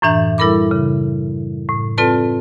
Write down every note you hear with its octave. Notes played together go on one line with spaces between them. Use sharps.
F#2 A2 E3 D4 E5 G6
G3 E4 A4 A#4 B5 D6
C#3
A2
C4 F4 A4 B4 D5 A5